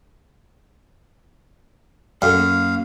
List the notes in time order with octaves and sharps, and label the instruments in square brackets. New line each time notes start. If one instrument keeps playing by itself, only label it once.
[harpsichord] F#2 [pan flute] A4 [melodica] F5
[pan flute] A#3